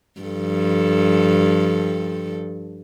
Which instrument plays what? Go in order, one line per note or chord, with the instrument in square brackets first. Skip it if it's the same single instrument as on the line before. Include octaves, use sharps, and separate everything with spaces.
[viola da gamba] G2 F3 A4